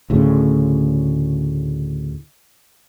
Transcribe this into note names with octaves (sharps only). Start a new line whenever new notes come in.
D2 A2 C#3